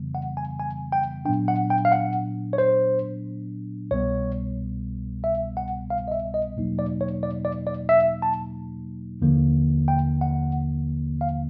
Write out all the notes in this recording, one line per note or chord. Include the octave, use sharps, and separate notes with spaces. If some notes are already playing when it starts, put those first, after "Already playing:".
Already playing: F2 C#3 E3 G3 B3
F#5
G#5
G#5
G5
A#2 F#3 B3 D4 G5
F#5
G5
F5
F#5
C#5
C5
C2 B2 G3 B3 C#5
E5
F#5
F5
D#5
E5
D#5
E2 B2 F#3 A#3 D#4
D5
C#5
D5
D5
D5
E5
A5
D#2 D3 F3 A#3
G5
F#5
F5